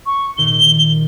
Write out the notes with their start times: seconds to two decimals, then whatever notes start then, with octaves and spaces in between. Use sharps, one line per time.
0.06 C#6
0.38 A#2 D#3 G7